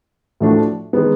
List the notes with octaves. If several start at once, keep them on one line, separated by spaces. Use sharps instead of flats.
A2 F3 A3 D4 F#4
D#3 G#3 B3